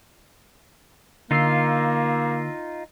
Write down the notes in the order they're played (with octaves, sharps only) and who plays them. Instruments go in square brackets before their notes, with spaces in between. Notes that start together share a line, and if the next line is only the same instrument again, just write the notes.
[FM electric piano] D3 E6 C7 [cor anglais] A#3 [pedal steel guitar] D#4 F4